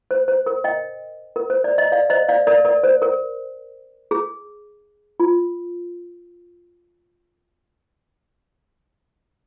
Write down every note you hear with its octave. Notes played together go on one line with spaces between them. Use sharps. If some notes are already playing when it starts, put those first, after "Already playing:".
C5
C5
A#4
D#5 G5
A#4
C5
D5
D#5
D5 F5
C5 D#5
D5 F5
A#4 D5
A#4 D5
C5
A#4
G#4
F4